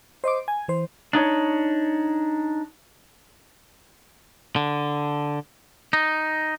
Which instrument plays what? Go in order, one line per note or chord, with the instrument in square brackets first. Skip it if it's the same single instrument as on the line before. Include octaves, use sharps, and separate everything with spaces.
[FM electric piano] C5 D#5 C6 D6
G#5
E3 C5
[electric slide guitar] D4 D#4 C#5
[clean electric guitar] D3
D#4